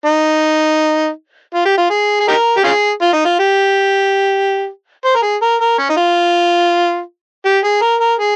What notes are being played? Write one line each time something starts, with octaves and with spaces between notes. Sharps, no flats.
D#4
F4
G4
F4
G#4
G#4
D#4 G4 A#4
G4
C#4 F4 G#4
F4
D#4
F4
G4
C5
A#4
G#4
A#4
A#4
C#4
D#4
F4
G4
G#4
A#4
A#4
G#4